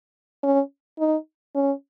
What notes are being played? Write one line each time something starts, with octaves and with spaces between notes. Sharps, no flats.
C#4
D#4
C#4